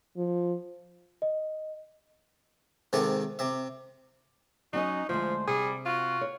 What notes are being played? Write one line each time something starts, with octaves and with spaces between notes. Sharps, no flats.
F3
D#5
G#2 C3 D#3 A4 E5
C3 E5
F#3 C#4 D#4 F#4 D#5
D2 F3 G#3 C5
C3 G3 G#4
F4 F#4
C#5